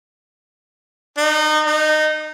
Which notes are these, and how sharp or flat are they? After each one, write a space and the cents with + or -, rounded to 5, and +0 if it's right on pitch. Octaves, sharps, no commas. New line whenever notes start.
D#4 -25
D#4 -20